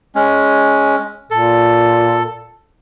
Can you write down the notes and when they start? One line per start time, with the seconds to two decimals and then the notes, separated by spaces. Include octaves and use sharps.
0.15 G#3 C#4
1.31 A#2 A4